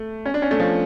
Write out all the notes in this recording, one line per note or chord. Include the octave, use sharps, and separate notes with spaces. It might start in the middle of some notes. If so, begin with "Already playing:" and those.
Already playing: A3
C#4
D4
C#4
A3
F3